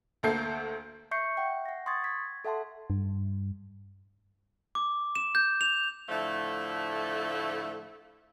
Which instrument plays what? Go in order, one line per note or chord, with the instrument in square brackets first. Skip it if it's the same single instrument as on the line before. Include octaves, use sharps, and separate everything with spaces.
[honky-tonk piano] D2 A3 A#3 A4 G6 C7
[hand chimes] E5 C#6 G6 C7 C#7
E5 F#5 G5
F#5 A#6
C6 C#6 D#6 G#6 A6
G#6 B6
A4 E5 F#5 A5 C6
[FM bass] G2
[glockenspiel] D6
E7
G6
F7
[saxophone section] A2 D3 F3 A3